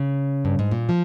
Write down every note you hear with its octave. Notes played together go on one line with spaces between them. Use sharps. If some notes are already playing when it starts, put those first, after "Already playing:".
Already playing: C#3
G2
G#2
A#2
F3